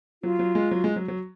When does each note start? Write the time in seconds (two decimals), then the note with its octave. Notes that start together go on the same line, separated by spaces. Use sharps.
0.23 F#3 F4
0.39 F#3
0.55 G#3
0.71 F#3
0.84 G#3
0.96 F#3
1.08 F#3